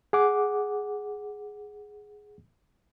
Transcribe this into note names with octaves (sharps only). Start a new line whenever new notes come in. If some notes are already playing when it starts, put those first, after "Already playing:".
G#4 F#5 D6